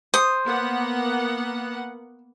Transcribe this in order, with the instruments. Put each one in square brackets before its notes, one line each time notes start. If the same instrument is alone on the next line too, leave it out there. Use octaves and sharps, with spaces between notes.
[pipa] C5 [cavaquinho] D#6
[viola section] A#3 B3 F#5